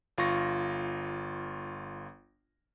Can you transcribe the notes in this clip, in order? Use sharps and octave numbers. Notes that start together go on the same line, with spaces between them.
G1 F4 C#6 A#6